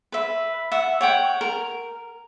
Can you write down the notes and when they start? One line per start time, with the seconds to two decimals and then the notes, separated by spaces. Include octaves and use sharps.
0.12 B4 E5
0.72 E5 F#5
1.01 C#5 F#5 G5
1.41 A#4